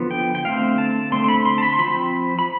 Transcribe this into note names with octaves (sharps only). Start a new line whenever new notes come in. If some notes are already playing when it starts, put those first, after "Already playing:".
Already playing: D3 F3 B3
G5
G5
D3 A3 C4 F5
A5
D3 A3 C4 C6
C6
B5
C6
A5
B5
C6
F3 C4 B5
B5